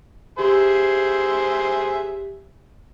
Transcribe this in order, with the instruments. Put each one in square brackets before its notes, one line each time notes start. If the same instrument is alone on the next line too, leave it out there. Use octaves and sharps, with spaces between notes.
[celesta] G4 [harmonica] G#4 C5 E5